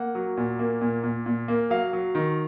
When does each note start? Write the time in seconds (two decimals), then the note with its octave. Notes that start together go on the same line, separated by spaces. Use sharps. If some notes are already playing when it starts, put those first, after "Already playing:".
Already playing: A#3 F#5
0.15 F#3
0.37 A#2
0.59 A#3
0.81 A#2
1.04 A#2
1.26 A#2
1.48 A#3
1.70 F#3 F5
1.93 F#3
2.15 D#3